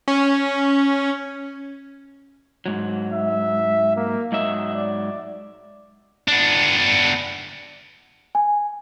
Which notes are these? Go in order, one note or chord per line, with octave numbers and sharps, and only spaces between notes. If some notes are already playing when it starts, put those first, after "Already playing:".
C#4
G#2 F#3
E5
A#3
G#2 F#3 D#5 E5
D5
B3 D4
G#5